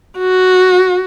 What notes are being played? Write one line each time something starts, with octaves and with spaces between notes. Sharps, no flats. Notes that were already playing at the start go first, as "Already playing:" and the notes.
F#4